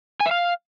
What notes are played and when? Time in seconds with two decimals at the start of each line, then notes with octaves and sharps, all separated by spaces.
0.20 G#5
0.26 E5
0.31 F5